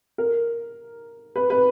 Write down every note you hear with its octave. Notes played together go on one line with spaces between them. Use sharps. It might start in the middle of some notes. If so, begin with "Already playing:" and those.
A#4
B4
B4